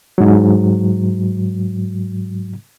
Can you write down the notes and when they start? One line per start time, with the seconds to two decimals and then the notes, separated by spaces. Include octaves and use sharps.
0.18 G#2 F#3